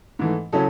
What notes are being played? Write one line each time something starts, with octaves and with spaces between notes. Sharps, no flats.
G#2 E3 A3
C#3 F#3 C#4 E4 A4